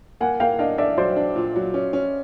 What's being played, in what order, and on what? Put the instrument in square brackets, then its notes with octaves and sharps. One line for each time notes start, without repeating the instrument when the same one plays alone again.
[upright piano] A#3 [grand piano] F#5 G#5
[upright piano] A#3 [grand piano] F5 G5
[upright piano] D4 [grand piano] D#5 F5
[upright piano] D4 [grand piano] D5 E5
[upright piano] F#3 [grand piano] C5 D5
[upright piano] D4
A#2
F#3
C#4
C#4